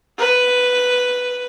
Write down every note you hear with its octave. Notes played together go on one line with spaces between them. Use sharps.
B4